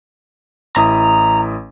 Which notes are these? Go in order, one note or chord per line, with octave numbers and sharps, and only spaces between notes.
A1 E4 A#5 D#6